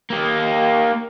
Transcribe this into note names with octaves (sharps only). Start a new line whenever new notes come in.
A#3 G4